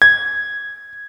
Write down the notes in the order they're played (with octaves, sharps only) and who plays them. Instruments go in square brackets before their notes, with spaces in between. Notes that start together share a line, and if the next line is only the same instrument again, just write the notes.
[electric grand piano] G#6